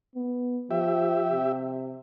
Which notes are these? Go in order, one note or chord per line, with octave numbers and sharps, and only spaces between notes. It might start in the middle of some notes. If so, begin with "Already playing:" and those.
B3
F3 G4 E5
C3